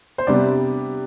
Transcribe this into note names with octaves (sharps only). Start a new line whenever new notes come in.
C5
C3 G3 B3 D4 D5